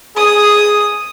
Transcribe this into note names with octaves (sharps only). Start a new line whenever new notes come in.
G#4 D#6